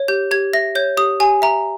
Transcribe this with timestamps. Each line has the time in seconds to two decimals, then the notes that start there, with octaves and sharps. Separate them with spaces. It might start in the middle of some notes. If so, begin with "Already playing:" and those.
Already playing: C#5
0.08 G4 G6
0.31 G4 G#6
0.53 E5 A#6
0.75 C#5 G6
0.97 G4 D#6
1.20 G4 G#5
1.42 E5 A#5